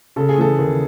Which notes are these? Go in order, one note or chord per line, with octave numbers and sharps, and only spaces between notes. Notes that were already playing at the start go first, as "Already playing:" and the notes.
C#3 A4
G#4
E3 A4
D#2